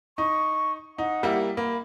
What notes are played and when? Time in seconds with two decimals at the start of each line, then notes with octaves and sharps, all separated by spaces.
0.18 D#4 C#6
0.98 D#4 F#5
1.23 G3 A#3 E4
1.57 A#3 B5